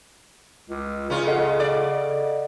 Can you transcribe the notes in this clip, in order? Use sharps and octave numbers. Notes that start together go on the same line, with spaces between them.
C#2
C#3 C#4 F4
A4 D#5 F#5
D5